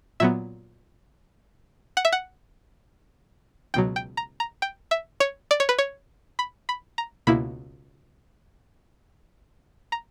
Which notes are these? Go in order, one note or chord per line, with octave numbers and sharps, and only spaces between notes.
A#2 F#3 B3 E5
F#5
E5
F#5
C#2 B2 F#3 G5
G5
A#5
A#5
G5
E5
C#5
D5
C#5
B4
C#5
B5
B5
A#5
C#2 B2 A#3 E4 B5
A#5